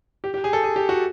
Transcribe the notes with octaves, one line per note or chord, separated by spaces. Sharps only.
G4
G4
G#4
A4
G#4
G4
F#4